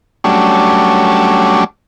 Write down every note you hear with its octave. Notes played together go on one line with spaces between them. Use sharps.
F#3 G3 A3 C#4 D4